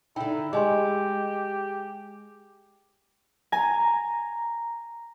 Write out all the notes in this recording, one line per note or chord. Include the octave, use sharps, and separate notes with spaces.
D3 D#4 E4 G5
G#3 G4 D#5 G#5 C6
G#5 A#5